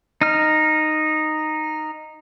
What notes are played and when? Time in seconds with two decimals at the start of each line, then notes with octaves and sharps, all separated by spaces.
0.21 D#4 F6